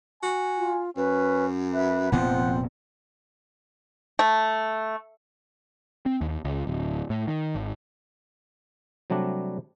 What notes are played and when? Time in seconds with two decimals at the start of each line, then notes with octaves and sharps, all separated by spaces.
0.23 F#4 G#5
0.58 F4
0.97 F#2 C#4 B4
1.74 B4 E5
2.12 F1 A#2 F3 B3 C4 F#5
4.19 A3
6.06 C4
6.21 D#2
6.44 C#2
6.67 D1
7.10 A2
7.27 D#3
7.55 G#1
9.10 C3 F#3 G3 A3 D4